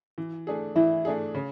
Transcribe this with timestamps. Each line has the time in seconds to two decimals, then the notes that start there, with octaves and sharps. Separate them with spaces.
0.18 E3
0.47 A3 D4 G#4
0.76 E3 E4
1.05 A3 D4 G#4
1.34 C#3